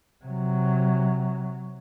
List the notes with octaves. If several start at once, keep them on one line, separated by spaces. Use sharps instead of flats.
C3 F#3